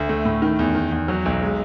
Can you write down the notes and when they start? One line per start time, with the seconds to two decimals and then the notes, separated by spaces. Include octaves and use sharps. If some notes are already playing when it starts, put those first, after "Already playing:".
Already playing: D2
0.09 A3
0.25 A2
0.42 D#3
0.59 E2
0.75 D#3
0.92 E2
1.08 F#3
1.25 B1
1.42 G#3